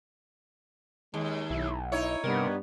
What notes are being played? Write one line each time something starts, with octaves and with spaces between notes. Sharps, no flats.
D#2 G#3
B1 E4
D#4 E4 C#5
G2 C3 G3 B3 A#4